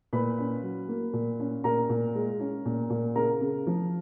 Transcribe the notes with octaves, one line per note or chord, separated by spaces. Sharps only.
A#2 B4 B5
C#4
F#3
A#3
A#2
C#4
A#2 A#4 A#5
A#2
G#3
C#4
A#2
A#2
C#3 A#4 A#5
C#3
F3